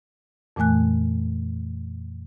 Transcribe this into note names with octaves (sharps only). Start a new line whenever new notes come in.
F2 A#2 E3 A3 G#5 F#6